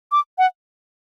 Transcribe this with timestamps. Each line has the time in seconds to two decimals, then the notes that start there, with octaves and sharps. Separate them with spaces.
0.12 D6
0.38 F#5